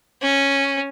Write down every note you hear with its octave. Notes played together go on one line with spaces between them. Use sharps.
C#4